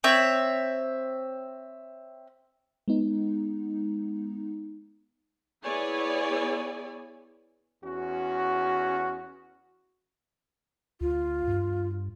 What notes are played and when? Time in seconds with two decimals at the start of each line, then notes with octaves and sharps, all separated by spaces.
0.04 C4 C#5 E5
2.88 G#3 B3 D#4
5.64 B3 E4 G#4 C#5 D5 G#5
7.83 E2 C#4 F#4
11.01 D2 F4
11.48 G2